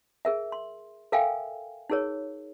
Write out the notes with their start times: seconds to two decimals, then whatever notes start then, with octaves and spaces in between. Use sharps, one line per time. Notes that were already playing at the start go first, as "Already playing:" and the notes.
0.25 G#4 A#4 E5
0.52 C6
1.12 A4 A#4 E5 F5 G5 G#5
1.90 D#4 F#4 G#4 A#4 C#5